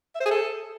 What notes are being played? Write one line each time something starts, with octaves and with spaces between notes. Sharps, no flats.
E5
C5
G#4
A4